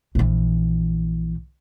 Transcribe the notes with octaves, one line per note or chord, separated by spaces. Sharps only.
A#1 E3